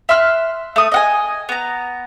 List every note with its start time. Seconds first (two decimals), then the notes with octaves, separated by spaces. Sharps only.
0.09 E5 C6 F6 F#6
0.76 A3 D#6
0.92 D#5 F#5 G#5
1.49 B3 A#5